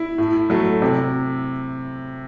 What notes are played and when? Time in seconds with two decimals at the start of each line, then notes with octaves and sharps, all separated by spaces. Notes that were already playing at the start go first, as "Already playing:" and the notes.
Already playing: E4
0.18 A2
0.50 F#3 A3
0.82 C3